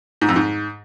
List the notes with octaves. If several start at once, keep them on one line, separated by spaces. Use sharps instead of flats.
G#2
F2
G#2